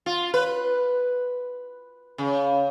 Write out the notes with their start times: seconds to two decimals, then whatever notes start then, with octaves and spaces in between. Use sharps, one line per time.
0.06 F4
0.34 B4
2.18 C#3